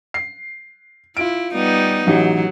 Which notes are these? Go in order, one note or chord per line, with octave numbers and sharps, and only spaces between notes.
C7
E4 F4 D7
G3 B3 D#4
A1 F#3 D#4 G4